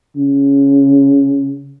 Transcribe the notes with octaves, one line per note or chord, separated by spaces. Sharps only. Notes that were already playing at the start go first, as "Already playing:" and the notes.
C#3